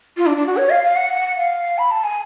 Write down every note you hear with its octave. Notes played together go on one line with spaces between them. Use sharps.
F4
D4
D4
F#4
C#5
F5
F5
F#5
F5
B5
A5
G#5